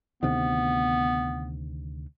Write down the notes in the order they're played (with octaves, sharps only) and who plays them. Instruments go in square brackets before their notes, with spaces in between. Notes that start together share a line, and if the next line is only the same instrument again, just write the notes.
[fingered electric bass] D2 C3 D#3 [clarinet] B3